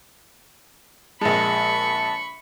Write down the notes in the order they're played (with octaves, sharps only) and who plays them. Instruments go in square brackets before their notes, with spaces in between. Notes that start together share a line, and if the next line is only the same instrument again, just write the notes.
[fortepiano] A#1 G#3 [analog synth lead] A5 [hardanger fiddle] B5 C#6